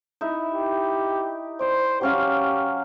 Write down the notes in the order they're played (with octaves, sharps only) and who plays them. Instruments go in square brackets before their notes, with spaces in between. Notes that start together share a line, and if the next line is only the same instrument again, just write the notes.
[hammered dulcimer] D#4 E4 E5
[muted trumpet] G4
[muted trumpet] C5 [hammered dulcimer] D5
[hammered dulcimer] F#3 C#4 F5 [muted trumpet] G4